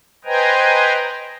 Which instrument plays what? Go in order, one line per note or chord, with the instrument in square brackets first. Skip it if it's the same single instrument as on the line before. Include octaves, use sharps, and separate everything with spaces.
[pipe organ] B4 C5 D#5 G5 G#5 A#5